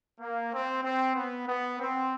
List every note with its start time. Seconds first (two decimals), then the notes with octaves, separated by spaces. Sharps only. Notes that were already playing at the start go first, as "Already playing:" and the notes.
0.20 A#3
0.52 C4
0.83 C4
1.15 B3
1.47 B3
1.79 C4